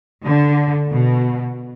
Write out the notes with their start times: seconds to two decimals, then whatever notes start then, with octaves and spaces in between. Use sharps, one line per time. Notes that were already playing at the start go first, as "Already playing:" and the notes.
0.24 D3
0.92 B2